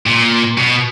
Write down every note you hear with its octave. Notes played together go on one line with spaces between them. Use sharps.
A#2
B2